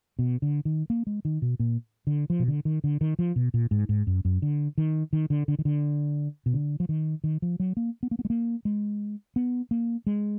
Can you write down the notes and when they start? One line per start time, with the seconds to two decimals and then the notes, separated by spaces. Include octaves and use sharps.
0.19 B2
0.42 D3
0.65 D#3
0.90 A#3
1.07 G#3
1.25 D#3
1.42 B2
1.60 A#2
2.07 D3
2.30 F3
2.40 B2
2.48 D3
2.65 D#3
2.84 D3
3.01 D#3
3.19 F3
3.36 B2
3.54 A#2
3.71 G#2
3.89 G#2
4.07 F#2
4.25 F#2
4.42 D3
4.78 D#3
5.13 D#3
5.30 D3
5.48 D3
5.59 D#3
5.65 D3
6.46 B2
6.54 D3
6.80 F3
6.89 D#3
7.24 D#3
7.42 F3
7.60 F#3
7.77 A#3
8.03 B3
8.11 A#3
8.19 B3
8.25 G#3
8.30 A#3
8.65 G#3
9.36 B3
9.71 A#3
10.07 G#3